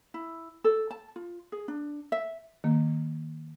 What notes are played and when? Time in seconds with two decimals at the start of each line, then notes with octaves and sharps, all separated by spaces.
0.14 E4
0.64 A4
0.91 A5
1.16 F4
1.52 G#4
1.68 D4
2.12 E5
2.64 D#3 A#3